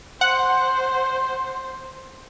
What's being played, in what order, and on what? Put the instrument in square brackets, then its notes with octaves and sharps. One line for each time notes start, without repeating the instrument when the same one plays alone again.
[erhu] C5 [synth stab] F#5